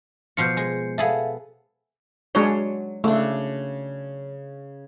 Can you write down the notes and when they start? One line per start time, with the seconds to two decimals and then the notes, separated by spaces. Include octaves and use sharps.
0.37 B2 F3 F4 G6 C7 C#7
0.57 G#3
0.98 B3 G#4 A4 E5 F5
2.35 F#3 G#3 D4 C#5 C6
3.04 C#3 A3 D4